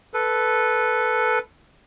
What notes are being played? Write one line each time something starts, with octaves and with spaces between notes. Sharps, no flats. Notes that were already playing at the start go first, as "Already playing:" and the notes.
A4 B4